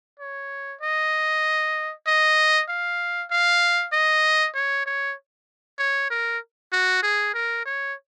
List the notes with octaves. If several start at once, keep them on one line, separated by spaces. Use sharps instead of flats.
C#5
D#5
D#5
F5
F5
D#5
C#5
C#5
C#5
A#4
F#4
G#4
A#4
C#5